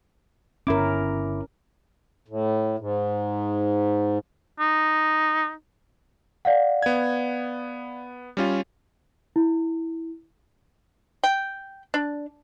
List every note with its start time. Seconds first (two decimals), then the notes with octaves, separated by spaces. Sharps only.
0.67 G1 C#4 E4 A#4 D6
2.28 A2
2.78 G#2
4.60 D#4
6.45 D5 F5 F#5
6.82 B3 G#6
8.37 G3 C#4 F4
9.36 E4
11.24 G5
11.94 D4